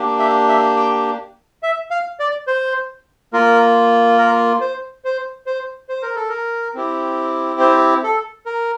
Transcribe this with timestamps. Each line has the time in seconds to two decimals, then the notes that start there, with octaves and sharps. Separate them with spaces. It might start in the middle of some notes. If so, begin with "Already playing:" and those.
Already playing: A#3 D4 G4
0.19 E5
0.48 E5
0.76 G5
1.63 E5
1.91 F5
2.20 D5
2.47 C5
3.33 A#3 F4 A#4
4.18 A#4
4.61 C5
5.05 C5
5.46 C5
5.89 C5
6.02 A#4
6.16 A4
6.29 A#4
6.74 C4 E4 G4
7.60 C5
8.03 A4
8.46 A#4